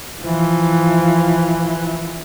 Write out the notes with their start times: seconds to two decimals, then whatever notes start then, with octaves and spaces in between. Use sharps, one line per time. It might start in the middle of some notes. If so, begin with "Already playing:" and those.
0.23 E3 F3